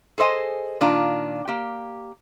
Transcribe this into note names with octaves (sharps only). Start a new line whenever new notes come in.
G#4 A4 C5 D#5 G#5
A#2 D#3 D4 F4 A#5
A#3 G4